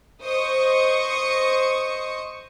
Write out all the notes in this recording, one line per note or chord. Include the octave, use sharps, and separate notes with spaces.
C5 D#5 C#6 D#6 C#7